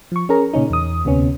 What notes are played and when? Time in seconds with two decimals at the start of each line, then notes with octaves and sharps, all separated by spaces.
0.12 F3 C#6
0.29 C#4 G#4 A#4 A#5
0.53 A#2 C#3 C#4 D#4
0.70 E2 D#6
1.05 D2 C3 B3 C#4